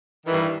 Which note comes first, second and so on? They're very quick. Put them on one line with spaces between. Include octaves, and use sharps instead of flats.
D#3 E3 G2